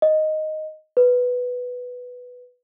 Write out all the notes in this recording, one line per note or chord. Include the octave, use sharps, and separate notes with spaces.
D#5
B4